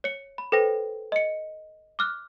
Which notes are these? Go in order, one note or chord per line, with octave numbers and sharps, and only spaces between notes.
C#5 C#7
B5
A4 B4 C5 G5 A#6
D#5 C#7
D6 F6 F#6